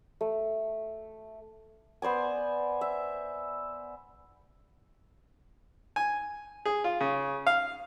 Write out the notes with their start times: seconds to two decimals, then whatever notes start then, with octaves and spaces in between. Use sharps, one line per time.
0.21 A3
2.02 B3 C5 D5 G#5
2.81 E5
5.96 G#5
6.65 G#4
6.84 F4
7.00 C#3
7.47 F5